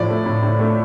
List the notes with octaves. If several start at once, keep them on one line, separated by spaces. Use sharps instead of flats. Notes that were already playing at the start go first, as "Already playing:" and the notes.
Already playing: A2 F3 D5
A3
A2
A2
A3